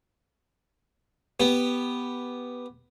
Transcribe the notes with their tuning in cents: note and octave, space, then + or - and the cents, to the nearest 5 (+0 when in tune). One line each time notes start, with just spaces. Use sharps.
B3 +0 G4 +0